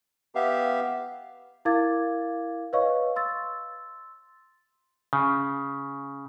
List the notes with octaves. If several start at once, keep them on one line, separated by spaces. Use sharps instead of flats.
B3 G4 E5 F5
E4 A#4 F5 D6 G#6 A6
B4 C#5 D#5 F5 C#6
C6 E6 A6
C#3